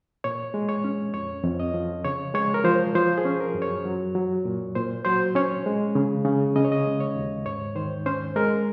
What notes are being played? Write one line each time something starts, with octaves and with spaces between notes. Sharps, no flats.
A#2 C#5
G#3
C#5
C#4
F2 C#5
F2
D#5
F3
C#3 C#5
G#3 C#5
A#4
F3 C5
F3 C5
G#4
C#4
A#4
F#2
C#5
F#3
F#3
A#2
A#2 C5
F#3 C5
C#4 C#5
G#3
C#3
C#3
C#3 D#5
C#5
D#5
G#3
C#5
D#2
G#2 C#5
D#3 C5
C#4 C5
G#3 A#4